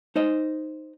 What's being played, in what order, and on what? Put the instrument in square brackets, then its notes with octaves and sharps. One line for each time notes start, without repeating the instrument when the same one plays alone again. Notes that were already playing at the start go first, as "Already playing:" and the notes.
[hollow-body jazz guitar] D#4 C5 D#5